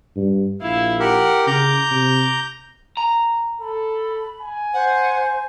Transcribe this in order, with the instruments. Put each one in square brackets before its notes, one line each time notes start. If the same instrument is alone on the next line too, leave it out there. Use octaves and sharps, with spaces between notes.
[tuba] G2
[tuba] A#1 [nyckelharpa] E4 F5
[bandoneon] G4 A#4 [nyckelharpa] F#5
[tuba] C#3 [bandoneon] A#5 G6 [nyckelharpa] D6
[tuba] C3
[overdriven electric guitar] A#5
[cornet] A4 [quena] B5
[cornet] G#5
[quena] C5 [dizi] F#5